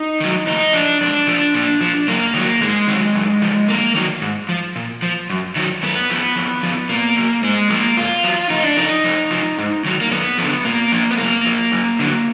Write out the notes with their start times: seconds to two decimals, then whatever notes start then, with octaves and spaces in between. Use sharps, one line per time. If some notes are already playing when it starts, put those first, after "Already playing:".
Already playing: D#4
0.20 D#3 F#3
0.47 F2 D#4
0.73 F3 D4
1.01 F2 D4
1.27 F3
1.54 A#2
1.81 F3
2.07 F#2 A#3
2.34 D#3 F#3
2.61 G#2 G#3
2.87 D#3 F#3
3.15 F#2
3.42 F3
3.68 F2 A#3
3.95 D#3 F#3
4.22 G#2
4.49 F3
4.76 A#2
5.02 F3
5.30 F#2
5.56 D#3 F#3
5.83 F#2 B3
6.10 F3
6.36 F2
6.63 F3
6.89 A#2 A#3
7.16 F#3
7.43 G#2 G#3
7.70 F3 A#3
7.97 G#2 F4
8.24 F#3
8.50 F2 D#4
8.63 D4
8.77 F3 D#4
9.04 F2
9.31 F3
9.58 G#2
9.85 D#3 F#3
10.01 A#3
10.11 F#2 B3
10.38 D3 F3
10.65 A#2 A#3
10.92 F3
11.11 B3
11.18 F#2 A#3
11.45 F3
11.72 F#2
11.99 D3 F#3